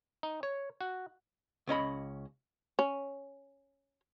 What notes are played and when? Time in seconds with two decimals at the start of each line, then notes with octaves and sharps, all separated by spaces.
0.23 D#4
0.43 C#5
0.81 F#4
1.67 C#2 C#4 D#5 B5
2.79 C#4